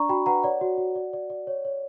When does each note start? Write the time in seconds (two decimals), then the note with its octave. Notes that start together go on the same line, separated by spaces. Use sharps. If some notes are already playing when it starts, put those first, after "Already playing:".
Already playing: D4 D5 A#5 C#6
0.09 F#4 G5 B5
0.26 B4 F#5 A#5
0.43 C#5 D5 F#5
0.61 F#4
0.78 F#4
0.95 D5
1.13 D5
1.30 D5
1.47 C#5
1.65 C#5